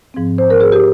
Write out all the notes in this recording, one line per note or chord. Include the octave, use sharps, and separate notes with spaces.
G#2 F3 C4
C5
A#4
G#4
G4